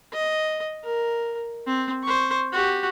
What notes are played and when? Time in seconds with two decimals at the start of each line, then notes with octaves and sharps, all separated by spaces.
0.13 D#5
0.84 A#4
1.67 C4
2.04 C5 C#6
2.52 F#4 G4